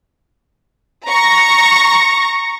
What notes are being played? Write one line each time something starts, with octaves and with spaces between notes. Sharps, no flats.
A#5 C#6 A#6